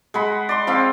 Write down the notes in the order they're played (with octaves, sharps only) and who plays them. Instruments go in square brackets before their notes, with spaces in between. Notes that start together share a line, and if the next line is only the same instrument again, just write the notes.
[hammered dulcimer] G#3 F#5 B5
D5 C6
F3 C4 F5